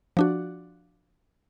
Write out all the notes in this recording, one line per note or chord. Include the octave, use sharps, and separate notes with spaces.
F3 D4 F#4